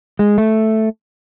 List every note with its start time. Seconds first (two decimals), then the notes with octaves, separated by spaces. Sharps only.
0.19 G#3
0.38 A3